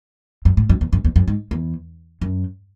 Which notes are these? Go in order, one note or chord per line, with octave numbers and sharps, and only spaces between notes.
F#2
A2
F#2
E2
F#2
E2
F#2
G#2
E2
F#2